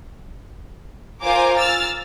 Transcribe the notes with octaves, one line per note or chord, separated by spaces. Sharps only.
F4 A#4 C5 G#5 D6
E6 F6 A6